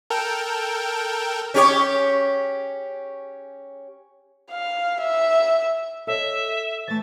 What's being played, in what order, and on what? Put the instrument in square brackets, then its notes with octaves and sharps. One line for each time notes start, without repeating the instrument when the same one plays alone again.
[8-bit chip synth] A4 A#4 G5
[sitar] C#4 G4 C#5
[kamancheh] F5
E5
[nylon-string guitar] A4 C#5 D#5 [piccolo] E5
[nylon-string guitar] E3 A3 [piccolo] A6